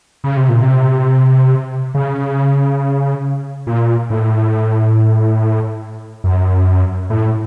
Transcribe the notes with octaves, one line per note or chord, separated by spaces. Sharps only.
C#3
C3
A#2
C3
C#3
A#2
A2
F#2
A2